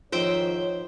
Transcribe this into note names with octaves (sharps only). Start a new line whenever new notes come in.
G#2 D#3 F3 D#4 C5 C#5 E5 G5